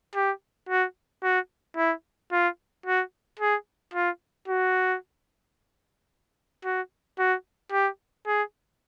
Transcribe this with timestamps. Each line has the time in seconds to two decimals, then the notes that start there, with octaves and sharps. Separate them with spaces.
0.15 G4
0.69 F#4
1.23 F#4
1.77 E4
2.32 F4
2.86 F#4
3.39 G#4
3.94 F4
4.48 F#4
6.65 F#4
7.19 F#4
7.72 G4
8.27 G#4